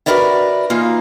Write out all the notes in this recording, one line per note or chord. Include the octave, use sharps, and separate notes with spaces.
F#4 G#4 A#4 B4 D5 E5
E3 A#3 D#4 F4